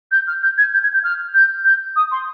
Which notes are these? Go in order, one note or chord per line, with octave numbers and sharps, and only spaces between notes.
G6
F6
G6
G#6
G6
G#6
G6
F6
G6
G6
D#6
C6